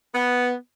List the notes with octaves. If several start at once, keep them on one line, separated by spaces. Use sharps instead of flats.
B3